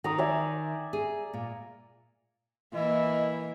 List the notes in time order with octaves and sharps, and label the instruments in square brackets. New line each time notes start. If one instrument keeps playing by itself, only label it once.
[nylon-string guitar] D#3 [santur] A#5 D#6
[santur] D5 E5 G#5
[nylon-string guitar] G#4
A#2
[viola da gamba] E3 A#3 [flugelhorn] E4 [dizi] D#5